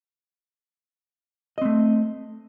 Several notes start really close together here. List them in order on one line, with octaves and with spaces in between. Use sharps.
D#5 C4 A3